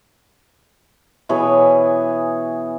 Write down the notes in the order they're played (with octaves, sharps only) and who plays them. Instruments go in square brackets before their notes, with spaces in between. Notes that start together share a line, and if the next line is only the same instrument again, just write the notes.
[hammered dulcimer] B2 E3 G#4 C#5